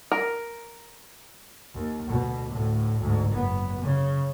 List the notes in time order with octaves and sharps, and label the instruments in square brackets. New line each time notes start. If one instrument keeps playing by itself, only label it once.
[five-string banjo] A#4
[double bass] D#2
D2 B2
D2 A2
D2 G#2
F#1 B3
C#3